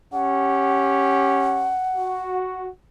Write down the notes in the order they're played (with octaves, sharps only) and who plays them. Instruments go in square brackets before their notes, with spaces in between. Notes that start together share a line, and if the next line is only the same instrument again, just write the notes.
[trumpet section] C#4 G4 [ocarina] F#5
[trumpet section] F#4